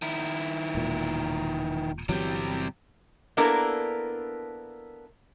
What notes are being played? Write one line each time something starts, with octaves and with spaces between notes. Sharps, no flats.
D#3 E4
E1 A#2
G1 C3 E3 F#3 G3
A#3 B3 D4 E4 A4 A#4